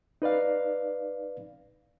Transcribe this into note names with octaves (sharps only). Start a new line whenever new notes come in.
D#4 B4 D5 F5